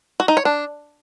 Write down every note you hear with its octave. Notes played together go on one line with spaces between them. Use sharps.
F#4
D#4
C#5
D4